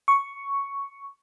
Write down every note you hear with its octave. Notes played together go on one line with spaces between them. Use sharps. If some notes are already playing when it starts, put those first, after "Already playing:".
C#6